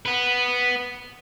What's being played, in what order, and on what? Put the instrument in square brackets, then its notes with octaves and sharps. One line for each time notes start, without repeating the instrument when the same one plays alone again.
[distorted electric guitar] B3 B4